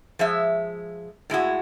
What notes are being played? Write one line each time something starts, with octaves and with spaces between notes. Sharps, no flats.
F3 G#3 E5
A2 G#3 E4 F#4